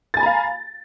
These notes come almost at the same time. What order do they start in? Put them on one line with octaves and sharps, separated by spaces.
A6 G#5 B5 A#5 F5